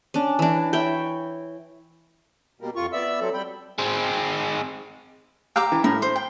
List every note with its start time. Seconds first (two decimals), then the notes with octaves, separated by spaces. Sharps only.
0.14 C#4 D4
0.39 E3 D4
0.73 E4 C#5 G5
2.61 B2 G3 A#3
2.76 F2 F4 C#6
2.93 B3 D5 E5 E6
3.20 F#3 C4 A4
3.34 G3 G5 B5
3.78 G#3 C4
5.56 G4 F5 G5 A#5 D6 E6
5.72 E3
5.84 A2 A#4
6.02 C5
6.16 G5